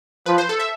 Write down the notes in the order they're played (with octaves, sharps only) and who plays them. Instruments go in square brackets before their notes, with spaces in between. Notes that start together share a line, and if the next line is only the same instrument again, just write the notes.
[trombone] F3 [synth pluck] B4
[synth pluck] C5
A4
E5